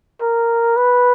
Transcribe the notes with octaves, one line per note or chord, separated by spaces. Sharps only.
A#4
B4